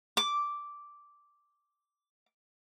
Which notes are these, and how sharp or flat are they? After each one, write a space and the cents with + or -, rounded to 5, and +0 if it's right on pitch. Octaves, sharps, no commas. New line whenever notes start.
D6 -5